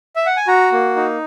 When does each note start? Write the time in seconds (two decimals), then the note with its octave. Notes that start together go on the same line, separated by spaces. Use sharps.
0.16 E5
0.26 F#5
0.37 G#5
0.48 F#4 A#5
0.72 A#3
0.96 D#4